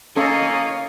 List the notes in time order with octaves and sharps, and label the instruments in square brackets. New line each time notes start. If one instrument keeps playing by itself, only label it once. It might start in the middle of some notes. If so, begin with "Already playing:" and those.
[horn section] A#3 D#5 [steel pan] C#4 A4 [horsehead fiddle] C#5 F5